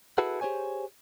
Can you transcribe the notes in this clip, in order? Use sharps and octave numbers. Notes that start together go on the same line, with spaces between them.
E4 F#4 G#4 A4 B4 F#5
G4 G#4 C5 C#5 G#5